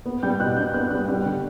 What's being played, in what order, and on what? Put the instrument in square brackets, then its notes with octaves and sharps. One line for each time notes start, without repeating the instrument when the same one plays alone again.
[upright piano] B3
G3 G6
B2 F#6
D4 G6
B3 F#6
G3 F#6
G3
D3